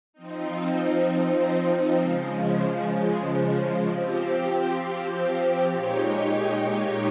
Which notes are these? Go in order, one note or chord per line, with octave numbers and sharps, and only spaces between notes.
F3 C4 D#4
C#3 F3 G#3
F3 C4 G4
A#2 G#3 D#4 G4 C#5